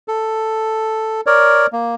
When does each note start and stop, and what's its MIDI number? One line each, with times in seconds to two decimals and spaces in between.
0.08 1.21 69
1.26 1.66 70
1.26 1.66 73
1.26 1.66 74
1.73 1.95 58